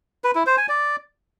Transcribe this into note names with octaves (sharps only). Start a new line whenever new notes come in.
B4
E4
C5
G#5
D5